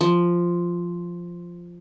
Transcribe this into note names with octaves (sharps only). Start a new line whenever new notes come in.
F3